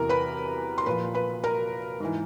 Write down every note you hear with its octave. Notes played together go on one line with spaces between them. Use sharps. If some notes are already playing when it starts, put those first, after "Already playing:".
Already playing: E2 C3 E3 A#4 A#5
B4 B5
C6
A#2 F3 B4 B5
B4 B5
A#4 A#5
G#2 E3